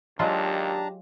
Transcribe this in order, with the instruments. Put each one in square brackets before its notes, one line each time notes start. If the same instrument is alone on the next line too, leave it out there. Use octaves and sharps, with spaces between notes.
[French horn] D#2 [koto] F#3 G#3 F4 [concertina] D4 A5 A#5 [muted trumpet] G4